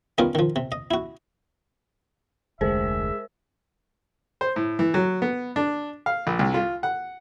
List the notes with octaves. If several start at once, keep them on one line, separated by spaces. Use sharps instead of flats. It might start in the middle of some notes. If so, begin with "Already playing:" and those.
G3 B3 C#4 D#4 F4 A#4
D#3 F3
C3
D#5
E4 F#4
F1 D2 G#3 A#4 C5 E5
C5
A2
E3
F#3
B3
D4
F5
A#1
C2
F4
F#5